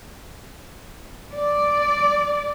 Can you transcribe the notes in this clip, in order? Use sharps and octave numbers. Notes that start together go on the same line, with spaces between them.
D5